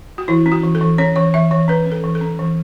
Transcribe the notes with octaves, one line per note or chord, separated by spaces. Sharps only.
F#4
E3 E4
C#4
F#4
E3
A4
E3
C#4 C#5
E3 C#5
E3 E5
E3 C#5
C#4 B4
C#4
A4
E3
A4
C#4
E3